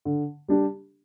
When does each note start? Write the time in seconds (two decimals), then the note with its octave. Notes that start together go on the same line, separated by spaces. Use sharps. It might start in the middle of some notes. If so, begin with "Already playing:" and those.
0.05 D3
0.48 G3 D4 G4